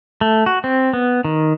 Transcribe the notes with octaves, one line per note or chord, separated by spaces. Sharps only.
A3
F#4
C4
B3
D#3